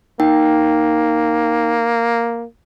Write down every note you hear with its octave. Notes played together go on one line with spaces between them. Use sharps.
A#3 D#4 G5